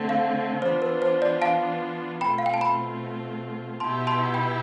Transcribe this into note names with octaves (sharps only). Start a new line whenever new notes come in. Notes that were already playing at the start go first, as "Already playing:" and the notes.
Already playing: D3 A3 C4
F5
E3 B3 D4 F4 C5
B4
C5
D5
F5 A5
B2 A3 C4 F4 G5 B5
F5
G5
A5
G5 B5
B2 B3 E4 G4 A5 C6
A5 C6
G5 B5